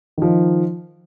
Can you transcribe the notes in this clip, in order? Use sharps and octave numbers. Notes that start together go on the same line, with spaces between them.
D#3 F3 D#4